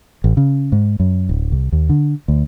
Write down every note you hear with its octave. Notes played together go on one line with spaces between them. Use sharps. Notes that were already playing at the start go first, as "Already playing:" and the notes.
A1
C#3
G#2
F#2
D1
C2
D#2
D3
D2